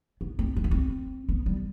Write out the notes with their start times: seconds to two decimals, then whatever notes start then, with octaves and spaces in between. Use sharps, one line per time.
0.21 B3
0.39 C4
0.56 C4
0.64 B3
0.71 C4
1.29 B3
1.46 G3